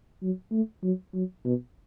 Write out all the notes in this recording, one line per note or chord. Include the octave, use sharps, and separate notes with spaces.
F#3
A3
F#3
F#3
B2